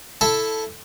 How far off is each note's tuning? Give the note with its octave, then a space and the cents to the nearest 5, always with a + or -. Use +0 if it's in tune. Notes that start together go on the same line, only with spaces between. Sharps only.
E4 +0 A4 +0 A5 -5